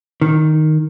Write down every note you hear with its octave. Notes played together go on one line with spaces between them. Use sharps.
D#3